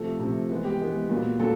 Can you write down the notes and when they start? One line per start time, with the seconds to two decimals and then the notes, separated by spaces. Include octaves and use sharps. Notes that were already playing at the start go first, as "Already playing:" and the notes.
Already playing: C3 F3 A3 A4
0.20 C3 F3 A3
0.49 E3 G#3 B3
0.65 G4
0.80 E3 G#3 B3
1.10 A#2 F#3 B3
1.40 A#2 F#3 A4